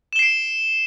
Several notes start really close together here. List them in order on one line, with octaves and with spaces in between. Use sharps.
E7 G7 C7 D7